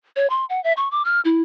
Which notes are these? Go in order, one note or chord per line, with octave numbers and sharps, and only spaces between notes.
C#5
C6
F#5
E5
C#6
D6
F6
E4